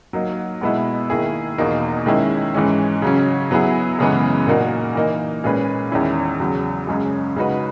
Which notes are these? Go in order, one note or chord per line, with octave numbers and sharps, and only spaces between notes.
F#3 A#3 D#4
B2 G#3 B3 E4
D#3 A#3 E4 G#4
E2 B2 A#3 D#4
D#3 G#3 C#4 E4
G#2 E3 G#3 C#4
C#3 F#3 C#4
F#3 B3 E4 G#4
F#2 C#3 E3 G#3 B3
A#2 A#3 D#4 F#4 A#4
E3 A#3 D#4
A#2 G#3 C#4 G#4 B4
E2 D#3 G#3 C#4 E4
E2 C#3 F#3
F#2 C#3 G#3 C#4
C#3 G#3 D#4 F#4 B4